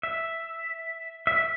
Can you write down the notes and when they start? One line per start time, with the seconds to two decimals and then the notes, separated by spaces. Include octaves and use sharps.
0.03 E5
1.27 E5